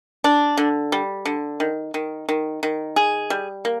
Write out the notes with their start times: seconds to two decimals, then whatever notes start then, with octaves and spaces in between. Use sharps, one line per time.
0.24 D4
0.57 D3
0.92 G3
1.25 D3
1.60 D#3
1.94 D#3
2.29 D#3
2.63 D#3
2.96 G#4
3.30 G3
3.65 A#3